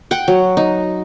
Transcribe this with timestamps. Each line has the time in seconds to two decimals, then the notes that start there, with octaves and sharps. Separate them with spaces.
0.11 F#5 G5
0.28 F#3
0.57 D#4